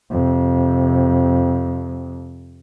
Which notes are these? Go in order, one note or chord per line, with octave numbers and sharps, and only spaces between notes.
F2 C3